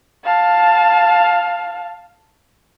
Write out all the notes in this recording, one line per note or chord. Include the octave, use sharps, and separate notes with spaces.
F5 A5